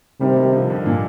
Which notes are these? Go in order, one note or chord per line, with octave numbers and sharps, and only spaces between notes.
C3 D#3 G3
D#3 G3
D3 F3
D3 F3
A#2 D3